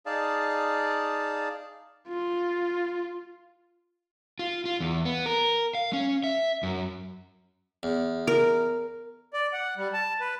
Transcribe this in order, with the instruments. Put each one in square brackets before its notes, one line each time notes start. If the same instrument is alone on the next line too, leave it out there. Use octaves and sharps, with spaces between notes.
[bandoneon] D#4 G#4 D5 F5 A5
[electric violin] F4
[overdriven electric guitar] F4
F4
E2
B3
A#4
F5
C#4
E5
F#2
[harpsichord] E2
[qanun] A#4
[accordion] D5
F#5
G3
A5
B4